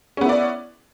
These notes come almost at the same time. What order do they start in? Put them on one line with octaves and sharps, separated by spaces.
C#4 B3 E4 D5